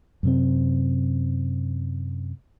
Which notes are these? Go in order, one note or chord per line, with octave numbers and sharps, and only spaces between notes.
F#2 C3 C4